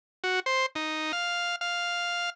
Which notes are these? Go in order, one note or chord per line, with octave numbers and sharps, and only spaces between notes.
F#4
C5
D#4
F5
F5